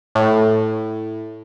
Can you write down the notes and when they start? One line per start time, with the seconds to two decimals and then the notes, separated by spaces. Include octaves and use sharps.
0.15 A2